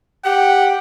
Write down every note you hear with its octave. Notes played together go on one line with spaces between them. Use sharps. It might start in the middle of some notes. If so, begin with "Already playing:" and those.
G4 F#5 G5